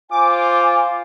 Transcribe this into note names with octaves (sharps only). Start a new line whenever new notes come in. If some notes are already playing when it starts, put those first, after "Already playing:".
F4 C5 G#5 D6